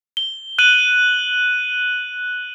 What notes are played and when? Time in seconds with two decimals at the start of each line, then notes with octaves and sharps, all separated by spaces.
0.17 G7
0.59 F#6 D#7 F#7